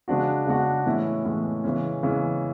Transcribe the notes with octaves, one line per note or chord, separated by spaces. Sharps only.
C#3 G#3 D4 F#4
C#3 G#3 D4 F#4
A2 E3 G#3 C#4 E4
A2 E3 G#3 C#4 E4
C#3 E3 G#3 C#4
C#3 E3 G#3 C#4